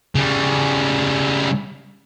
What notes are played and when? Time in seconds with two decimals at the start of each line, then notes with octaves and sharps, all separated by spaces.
0.15 C#3 G3